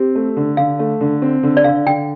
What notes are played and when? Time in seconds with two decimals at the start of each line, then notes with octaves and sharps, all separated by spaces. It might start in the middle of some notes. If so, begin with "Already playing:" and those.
Already playing: C4 G4
0.15 A3
0.37 D3
0.57 D3 F5
0.79 A3
1.01 D3
1.22 C4
1.43 D3
1.57 D5
1.64 D3 F5
1.86 D3 G5